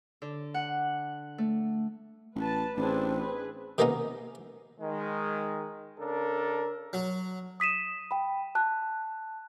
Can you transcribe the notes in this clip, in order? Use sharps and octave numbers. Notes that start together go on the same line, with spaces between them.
D3
F#5
A3
A1 B4 A5
A1 C4 D4 G#4 B4
G#4 B4
C3 D#3 A#3 B3 C#4 D#4
D#3 G#3
C#3 D4 A4 A#4
F#3
D#6 B6 D#7 E7
G5 B5
A5 F#6